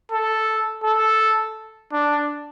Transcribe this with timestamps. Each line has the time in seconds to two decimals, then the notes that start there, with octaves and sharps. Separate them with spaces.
0.12 A4
0.84 A4
1.92 D4